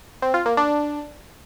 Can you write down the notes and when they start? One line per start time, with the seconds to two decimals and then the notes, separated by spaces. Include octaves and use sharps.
0.22 C4
0.34 F4
0.46 A#3
0.57 D4